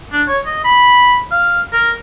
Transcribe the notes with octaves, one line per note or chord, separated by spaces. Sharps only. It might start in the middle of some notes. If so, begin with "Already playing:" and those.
D4
C#5
D#5
B5
F5
A#4